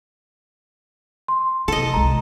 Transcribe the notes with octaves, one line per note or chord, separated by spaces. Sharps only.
C6
C3 A4 D#5
C2 G#3 A#5